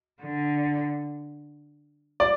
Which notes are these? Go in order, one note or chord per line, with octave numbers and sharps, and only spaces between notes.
D3
D5